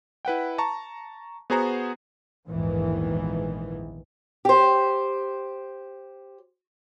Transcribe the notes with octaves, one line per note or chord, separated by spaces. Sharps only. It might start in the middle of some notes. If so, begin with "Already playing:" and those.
E4 B4 F#5 G5
A5 A#5 C#6
B3 F#4 G#4 C5 G#5 A#5
A#1 E2 G#2 D#3 E3
G4 C5